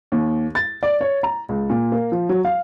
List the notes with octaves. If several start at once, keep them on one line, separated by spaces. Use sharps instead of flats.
D#2
A6
D5
C#5
A#5
C#2
A#2
A#3
F3
F#3
F5